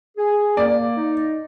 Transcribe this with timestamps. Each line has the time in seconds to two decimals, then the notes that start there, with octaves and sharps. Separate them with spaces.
0.18 G#4
0.57 A#3 D5
0.97 D#4